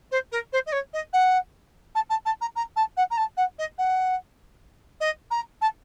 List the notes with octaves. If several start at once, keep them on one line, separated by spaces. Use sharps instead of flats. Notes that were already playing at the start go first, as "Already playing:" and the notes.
C5
A#4
C5
D#5
C#5
D#5
F#5
A5
A5
A5
A#5
A#5
A5
F#5
A#5
A5
F#5
D#5
F#5
D#5
A#5
A5